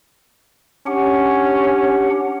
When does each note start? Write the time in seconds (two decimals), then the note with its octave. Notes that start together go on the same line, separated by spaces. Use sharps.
0.87 C#4 D4 G4 F#5